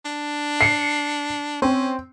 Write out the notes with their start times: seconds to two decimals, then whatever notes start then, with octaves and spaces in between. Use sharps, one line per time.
0.05 D4
0.61 C7 C#7
1.62 C4 C#4